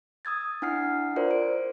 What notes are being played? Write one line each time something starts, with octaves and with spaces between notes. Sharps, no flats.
D#6 E6 G#6 A6
D4 E4 F#5 F6 C7
F4 A#4 C5 D5
C5 D7